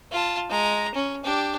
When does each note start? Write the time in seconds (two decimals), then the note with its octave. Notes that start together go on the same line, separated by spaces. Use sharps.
0.11 F4 A5
0.49 G#3 A#5
0.95 C#4
1.24 D4 G4